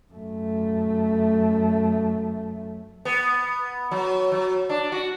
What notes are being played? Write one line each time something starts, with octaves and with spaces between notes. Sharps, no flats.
F#2 A3
B3
F#3
F#3
D4
F#4